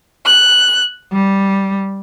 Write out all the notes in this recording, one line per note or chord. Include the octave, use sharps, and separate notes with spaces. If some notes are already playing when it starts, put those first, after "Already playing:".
F#6
G3